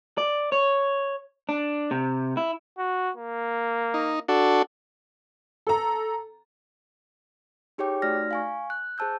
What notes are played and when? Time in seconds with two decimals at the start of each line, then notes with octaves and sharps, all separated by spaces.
0.18 D5
0.52 C#5
1.49 D4
1.91 C3
2.37 E4
2.79 F#4
3.17 A#3
3.94 D#4
4.29 D4 F#4 A4
5.67 A4 A#5
7.78 D#4 G4 G#4 C#5 G5 D6
8.02 A3 D#4 F#4 D5 F6 A#6
8.31 F5 G#5 C#6
8.70 F#6
8.98 G#4 C5 A5 E6 G6